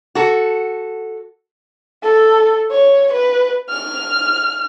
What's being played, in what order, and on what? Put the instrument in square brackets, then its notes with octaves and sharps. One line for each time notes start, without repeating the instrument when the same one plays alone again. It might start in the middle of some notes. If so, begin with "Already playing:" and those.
[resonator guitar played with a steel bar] F#4 A4
[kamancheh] A4
C#5
B4
F6